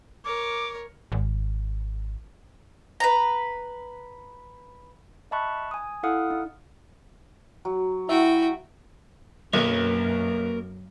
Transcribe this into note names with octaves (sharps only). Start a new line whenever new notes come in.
A#4 C#5 D6
G#1
B4 A#5
D#5 E5 A5 B5 C#6 F#6
G#5 D#6
E4 A4 F5 F#5 D#6 F6
D#4
F#3
E4 F#4 E5 G5
B1 F#2 A#3 A#4 B4 C#5